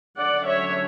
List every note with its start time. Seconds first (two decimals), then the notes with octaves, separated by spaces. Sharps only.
0.18 D3 F#3 C#4 D5 F#5
0.47 C#5 E5